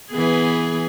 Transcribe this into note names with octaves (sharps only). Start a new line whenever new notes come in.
E3 B3 G#4